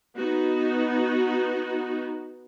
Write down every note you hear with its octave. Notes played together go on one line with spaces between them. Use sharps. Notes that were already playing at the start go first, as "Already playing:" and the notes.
B3 D#4 F#4